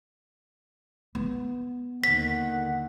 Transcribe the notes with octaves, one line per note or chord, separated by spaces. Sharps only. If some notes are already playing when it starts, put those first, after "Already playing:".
B3
D#2 D3 D#3 F#5 B6